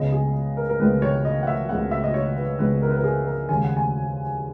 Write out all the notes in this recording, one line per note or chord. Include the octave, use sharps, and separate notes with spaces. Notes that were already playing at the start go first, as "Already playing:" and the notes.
Already playing: C#2 C#3 G#3 B3 D#5
G#4
A#4
A#4
C#2 C#3 G#3 B3 B4
C#5
D#5
F#5
E5
C#2 C#3 G#3 B3 F#5
E5
D#5
C#5
B4
C#2 C#3 G#3 B3 B4
A#4
B4
A#4
G#4
A#4
D#2 C#3 G#3 G#5
F#5
G#5